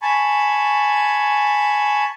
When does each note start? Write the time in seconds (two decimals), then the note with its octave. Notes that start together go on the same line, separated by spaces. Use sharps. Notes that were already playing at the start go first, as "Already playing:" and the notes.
0.02 G#5 A5 B5 C#6